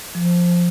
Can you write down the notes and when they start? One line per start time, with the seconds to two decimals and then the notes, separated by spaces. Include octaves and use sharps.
0.15 F3
0.37 F3